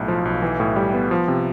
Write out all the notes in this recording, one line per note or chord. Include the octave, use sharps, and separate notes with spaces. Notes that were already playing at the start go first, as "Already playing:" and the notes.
Already playing: B1 A2
F3
B1
E3
A2
G3
B3
F3
C3